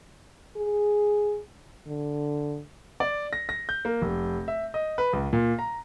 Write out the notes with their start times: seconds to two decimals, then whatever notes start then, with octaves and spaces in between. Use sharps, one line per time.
0.57 G#4
1.87 D3
3.00 D5
3.33 A#6
3.49 A#6
3.69 G6
3.85 A#3
4.02 F1
4.48 E5
4.74 D#5
4.98 B4
5.13 C#2
5.33 A#2
5.59 A#5